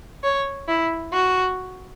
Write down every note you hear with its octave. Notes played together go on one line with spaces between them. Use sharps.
C#5
E4
F#4